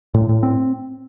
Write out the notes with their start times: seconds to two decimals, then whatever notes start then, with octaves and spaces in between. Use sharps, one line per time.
0.14 A2
0.29 A2
0.43 C4